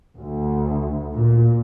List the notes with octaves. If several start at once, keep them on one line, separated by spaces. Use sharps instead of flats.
D2
A#2